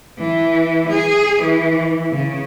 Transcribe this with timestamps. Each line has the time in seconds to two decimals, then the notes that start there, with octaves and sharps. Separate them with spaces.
0.19 E3
0.90 G#4
1.42 E3
2.11 C#3